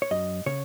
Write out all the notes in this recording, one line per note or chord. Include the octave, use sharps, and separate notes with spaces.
C#5
F#2 D#5
C#3 C#5